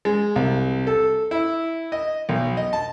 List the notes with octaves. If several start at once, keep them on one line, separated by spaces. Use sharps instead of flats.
G#3
C2
A4
E4
D#5
B1
D#5
A5